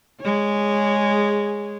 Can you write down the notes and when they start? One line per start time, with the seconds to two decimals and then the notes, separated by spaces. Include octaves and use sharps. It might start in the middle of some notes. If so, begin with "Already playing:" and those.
0.21 G#3 G#4 C#5